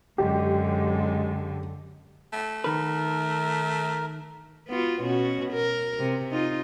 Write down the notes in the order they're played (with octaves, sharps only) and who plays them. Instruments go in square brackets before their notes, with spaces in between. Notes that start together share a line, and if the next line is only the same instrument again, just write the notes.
[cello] F#2 D3 [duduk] G#3 [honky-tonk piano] G4
[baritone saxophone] A3
[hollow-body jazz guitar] D#3 B4 [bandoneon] A#4
[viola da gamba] B3 F4 F#4
B2 C#4 F#4
A#4
C3
D#4 F4